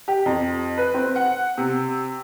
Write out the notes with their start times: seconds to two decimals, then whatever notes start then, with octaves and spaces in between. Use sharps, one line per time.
0.08 G4
0.26 F2
0.78 B4
0.94 C4
1.15 F#5
1.58 C3